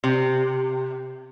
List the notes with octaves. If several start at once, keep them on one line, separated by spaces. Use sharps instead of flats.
C3